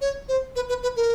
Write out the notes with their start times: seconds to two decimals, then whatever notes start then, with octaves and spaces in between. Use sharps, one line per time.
0.01 C#5
0.28 C5
0.56 B4
0.69 B4
0.83 B4
0.96 A#4